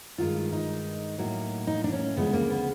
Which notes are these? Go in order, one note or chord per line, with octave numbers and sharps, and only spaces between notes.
G2 D#3 G#3 F4
D#4
A2 F#3 A#3
D#4
D4
C#4
D2 C#3 F3 G#3 B3
A#3
B3